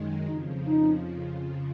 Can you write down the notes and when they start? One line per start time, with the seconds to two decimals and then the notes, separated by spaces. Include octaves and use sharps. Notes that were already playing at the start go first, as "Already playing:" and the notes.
Already playing: F#2 D#3 G#3
0.26 F2 C#3 F3 D#4
0.66 D#4